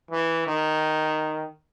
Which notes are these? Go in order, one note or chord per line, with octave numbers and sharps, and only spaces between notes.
E3
D#3